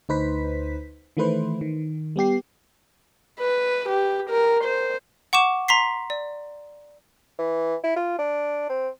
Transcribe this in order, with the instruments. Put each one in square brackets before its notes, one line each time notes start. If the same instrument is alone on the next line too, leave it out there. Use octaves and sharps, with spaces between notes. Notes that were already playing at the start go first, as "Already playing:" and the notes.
[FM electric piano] D2 D#4 B4 C5 B6
D#3 E3 A3 E4 B4 C5
D#3
G3 B3 G4 C7
[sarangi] B4
G4
A#4
C5
[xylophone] F#5 C#6 D6 E7
A#5 C6 B6 C7
D5
[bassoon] E3
E4
F4
D4
C4